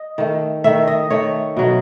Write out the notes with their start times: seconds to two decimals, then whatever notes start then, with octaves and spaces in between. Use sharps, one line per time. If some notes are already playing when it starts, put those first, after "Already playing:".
Already playing: D#5
0.18 D#3 A3
0.64 D#3 A3 E5
0.87 D#5
1.10 D#3 A3 C#5
1.57 B2 F#3 A3